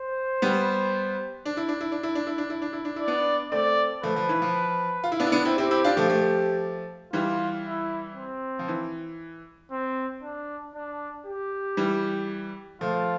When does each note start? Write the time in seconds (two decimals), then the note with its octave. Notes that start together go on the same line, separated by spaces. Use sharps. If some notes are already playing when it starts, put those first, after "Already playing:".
Already playing: C5
0.42 G3 B3
1.45 D4
1.57 E4
1.68 D4
1.81 E4
1.92 D4
2.03 E4
2.15 D4
2.27 E4
2.38 D4
2.50 E4
2.62 D4
2.73 E4
2.85 D4
2.96 E4 D5
3.08 B3 D4
3.51 A3 C4 D5
4.03 F3 A3 B4
4.16 F3
4.29 E3
4.42 F3
5.04 F4
5.12 E4
5.20 B3 D4
5.27 E4
5.32 B3 D4
5.45 C4 E4
5.58 C4 E4 G4
5.71 C4 E4
5.84 D4 F4
5.97 F3 A3
6.10 F3 A3
7.12 E3 G3 F4
7.65 E4
8.16 C4
8.59 F3
8.68 E3
9.71 C4
10.23 D4
10.75 D4
11.26 G4
11.77 E3 G3
12.81 F3 A3 F4